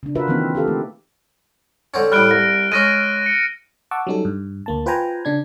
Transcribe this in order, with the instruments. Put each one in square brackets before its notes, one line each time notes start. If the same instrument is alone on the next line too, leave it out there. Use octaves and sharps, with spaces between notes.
[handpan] C#3 D4
F4 F#4 A#4 B4 E5
D#3 E3 A#3 C4 D#4
F4 G4 A4 F5
A3
[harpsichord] D3 C4 C#4
[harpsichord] A2 G3 [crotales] F6 F#6 D7
[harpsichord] C2 [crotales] A#6
[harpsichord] G#3 C#4 [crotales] F6 A#6 D#7
[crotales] C#7
[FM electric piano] F#5 A5 C#6 D6 E6
F#3 G3 C#4 D#4 A4
G2
D2 A#3 A5
F4 B4 C5 G5 G#5 A#5
C#3 D4 G#6